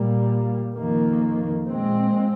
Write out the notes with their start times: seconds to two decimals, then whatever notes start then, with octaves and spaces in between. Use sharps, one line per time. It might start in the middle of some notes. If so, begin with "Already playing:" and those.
Already playing: A#2 G3 A#3
0.75 F2 D#3 A#3
1.66 A#2 G#3 C4